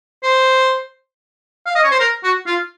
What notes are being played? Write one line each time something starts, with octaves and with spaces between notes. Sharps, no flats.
C5
F5
D#5
C#5
C5
A#4
F#4
F4